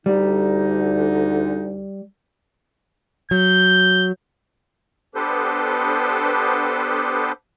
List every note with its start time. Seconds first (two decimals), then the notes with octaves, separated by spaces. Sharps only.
0.06 D2 D3 G3 D#4
3.31 F#3 G6
5.15 B3 D4 G4 A4 B4 C5